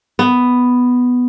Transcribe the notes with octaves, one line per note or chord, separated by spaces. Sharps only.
B3